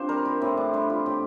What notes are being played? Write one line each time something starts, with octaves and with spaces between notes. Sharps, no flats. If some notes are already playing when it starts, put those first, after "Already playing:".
Already playing: C4 D4 F4 G4 C5
G3 A#4
E4
A2 C4
D4
G3 E4
F4
A2 G4